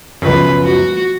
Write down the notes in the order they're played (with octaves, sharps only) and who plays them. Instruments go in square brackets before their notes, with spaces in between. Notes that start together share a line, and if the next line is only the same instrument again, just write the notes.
[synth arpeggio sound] C#2 F#2 [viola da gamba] B2 F3 B4
[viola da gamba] F#4